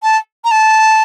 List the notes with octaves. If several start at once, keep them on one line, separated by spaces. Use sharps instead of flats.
A5
A#5
A5